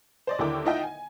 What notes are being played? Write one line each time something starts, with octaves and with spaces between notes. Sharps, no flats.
C5 D5 D#5
D#2 D3 E4 A#4 G5 D6
D#4 F4 D#5 E5 F#5 G5
G#5